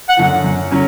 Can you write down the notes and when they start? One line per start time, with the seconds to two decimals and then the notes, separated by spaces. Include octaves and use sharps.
0.09 F#5
0.17 F#2 D3 F3
0.44 F#2
0.71 D3 F#3 C#4